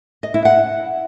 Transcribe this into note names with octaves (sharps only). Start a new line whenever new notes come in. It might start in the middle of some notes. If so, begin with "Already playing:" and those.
D#5
E4
F#5